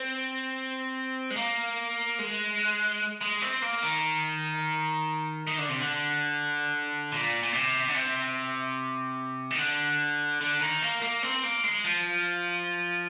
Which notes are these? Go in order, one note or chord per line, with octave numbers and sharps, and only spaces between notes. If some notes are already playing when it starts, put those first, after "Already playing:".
Already playing: C4
G#3
A#3
G#3
G#3
C4
A#3
D#3
D#3
D3
C3
D3
A#2
A#2
C3
D3
C3
D#3
D3
D3
D#3
A#3
A#3
C4
A#3
G#3
F3